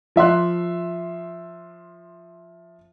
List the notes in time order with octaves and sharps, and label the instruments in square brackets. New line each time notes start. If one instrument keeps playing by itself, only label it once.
[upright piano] F3 E5 C6 F#6